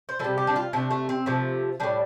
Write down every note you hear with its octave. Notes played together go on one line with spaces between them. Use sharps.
C5
C3 G3 A4
G4
D4
F4
C3 A3 D4
A3
C4
C3 F3 A3
A2 G3 D4